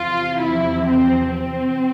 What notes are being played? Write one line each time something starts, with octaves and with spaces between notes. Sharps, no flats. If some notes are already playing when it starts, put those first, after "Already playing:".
Already playing: E2 C3 F3 F4
E4
C4
C4